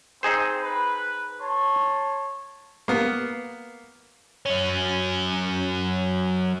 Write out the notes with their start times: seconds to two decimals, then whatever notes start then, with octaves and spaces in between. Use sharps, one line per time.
0.23 C4 D#4 G#4 C5
0.62 B4
1.40 C#5 A5 C6
2.88 A#3 B3
4.46 F#3 C#4